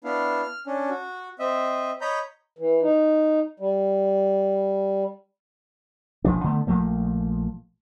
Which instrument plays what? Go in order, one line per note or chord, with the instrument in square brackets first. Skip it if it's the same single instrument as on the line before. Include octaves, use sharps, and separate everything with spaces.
[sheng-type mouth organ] B3 D4 E4 F5
F6
C#4 D4
F#4
C4 D#5 E5
C#5 D#5 A#5 B5 G6
[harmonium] E3
D#4
G3
[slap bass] E1 A#1 F3 D4
D3 A3 B3
A#1 F3 A3 A#3